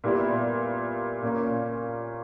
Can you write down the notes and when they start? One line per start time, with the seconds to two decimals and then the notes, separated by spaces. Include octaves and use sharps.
0.04 A#2 G3 B3 E4
1.23 A#2 A#3 C#4